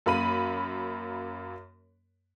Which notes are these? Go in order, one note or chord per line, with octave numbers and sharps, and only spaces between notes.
F#2 A#3 B5 D#7